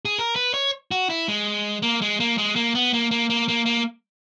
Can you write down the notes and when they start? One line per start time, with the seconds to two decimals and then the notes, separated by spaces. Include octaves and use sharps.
0.05 G#4
0.18 A#4
0.36 B4
0.54 C#5
0.91 F#4
1.10 E4
1.28 G#3
1.82 A#3
2.01 G#3
2.20 A#3
2.38 G#3
2.56 A#3
2.75 B3
2.93 A#3
3.11 A#3
3.30 A#3
3.48 A#3
3.66 A#3